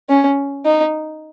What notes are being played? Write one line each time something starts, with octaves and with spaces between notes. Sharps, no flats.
C#4
D#4